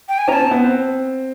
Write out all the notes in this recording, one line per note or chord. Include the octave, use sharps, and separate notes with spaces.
G5
G#5
C#4 A5 A#5
C4
B3
C4